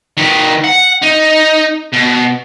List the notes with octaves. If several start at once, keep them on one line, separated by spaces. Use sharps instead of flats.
D#3 B4
F#5
D#4
B2